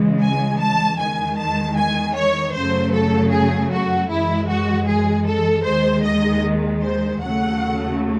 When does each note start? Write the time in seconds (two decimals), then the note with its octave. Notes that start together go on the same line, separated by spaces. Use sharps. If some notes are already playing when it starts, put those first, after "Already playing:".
Already playing: C#2 C#3 E3 G#3
0.20 G#5
0.60 A5
0.98 E2 D#3 G#3 G#5
1.38 A5
1.77 G#5
2.15 C#5
2.54 F#2 C#3 F#3 A3 C5
2.93 A4
3.31 G#4
3.71 F#4
4.10 F#2 E3 G#3 E4
4.49 F#4
4.87 G#4
5.26 A4
5.65 D#2 D#3 G#3 C5
6.04 D#5
6.82 C5
7.21 D#2 C#3 F#3 A3 F#5